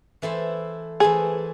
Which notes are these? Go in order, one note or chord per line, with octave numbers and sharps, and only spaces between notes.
E3 A3 E4 A4 C5
E3 A3 E4 G#4 A4 C5